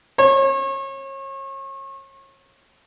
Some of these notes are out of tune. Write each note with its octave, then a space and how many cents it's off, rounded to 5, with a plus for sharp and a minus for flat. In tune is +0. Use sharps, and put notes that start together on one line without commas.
C#5 -35